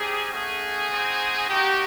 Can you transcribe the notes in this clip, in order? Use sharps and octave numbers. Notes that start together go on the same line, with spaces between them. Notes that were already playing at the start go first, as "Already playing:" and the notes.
Already playing: G3 C4 D#4 G4 G#4
A3 C#4 F#4 G#4
C4 D#4 F#4
A#3 D#4 F#4 G4